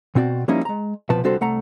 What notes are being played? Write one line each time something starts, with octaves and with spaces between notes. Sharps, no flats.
B2 C4 F#4 D5
F3 G3 A#3 C#4 D#4 E4
G#3 A#5
C2 B2 F3 B4 A5
C2 D3 G3 F#4 A4 C5
C2 A3 F#5 A#5